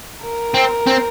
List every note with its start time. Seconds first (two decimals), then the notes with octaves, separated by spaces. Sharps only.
0.23 A#4
0.54 C4
0.87 C4